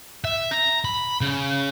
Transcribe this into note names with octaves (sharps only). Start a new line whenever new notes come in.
E5
A#5
B5
C#3